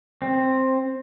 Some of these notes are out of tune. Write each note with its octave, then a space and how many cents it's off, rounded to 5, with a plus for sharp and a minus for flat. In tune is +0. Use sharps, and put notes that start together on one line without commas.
C4 +5